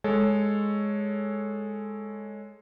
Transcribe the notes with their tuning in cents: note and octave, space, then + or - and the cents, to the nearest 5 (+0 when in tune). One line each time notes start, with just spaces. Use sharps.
G#3 +0 A4 +0 C#5 +0